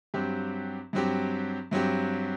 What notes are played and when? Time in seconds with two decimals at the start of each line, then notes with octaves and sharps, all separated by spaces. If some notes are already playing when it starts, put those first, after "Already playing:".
0.14 G2 F#3 C4 G4
0.93 G2 F#3 C4 G4
1.71 G2 F#3 C4 G4